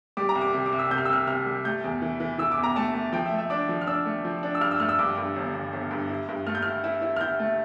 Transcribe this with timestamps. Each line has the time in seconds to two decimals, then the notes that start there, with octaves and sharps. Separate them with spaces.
0.17 G3 D6
0.29 A#5
0.35 C2
0.41 D6
0.54 C3
0.66 D6
0.72 C2
0.79 E6
0.91 C3 G6
0.98 F6
1.05 E6
1.09 C2 F6
1.27 C2 F6
1.46 G3
1.65 A3 G6
1.84 E2
2.02 E3
2.20 E3
2.38 E3 E6
2.52 D6
2.57 E2
2.63 A#5
2.76 A3 A5
2.95 A3
3.13 F3 G5
3.26 E5
3.32 A3
3.38 E5
3.50 D4 D6
3.69 F3
3.81 F6
3.87 D4 E6
4.06 A3
4.25 F3
4.43 D4
4.55 E6
4.61 G2 F6
4.71 E6
4.80 A3 F6
4.89 E6
4.99 G2 D6
5.17 G2
5.36 G1
5.54 G1
5.73 G1
5.91 G2
6.09 E4
6.28 G2
6.46 A3 F6
6.55 G6
6.62 E4 F6
6.84 E4
7.02 E4
7.16 F6
7.21 E4 G6
7.39 A3